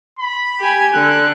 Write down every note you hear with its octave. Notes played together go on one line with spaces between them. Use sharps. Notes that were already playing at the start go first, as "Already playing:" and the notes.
B5
G4 G#5
D3 F#6